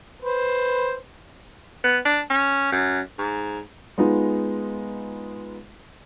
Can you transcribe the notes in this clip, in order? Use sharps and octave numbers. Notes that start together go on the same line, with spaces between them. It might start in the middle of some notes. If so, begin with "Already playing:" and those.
B4 C5
B3
D4
C#4
F#2
G#2
G#3 B3 D#4 F4